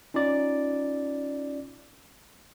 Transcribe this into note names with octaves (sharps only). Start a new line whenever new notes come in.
C#4 D#4 F4 D5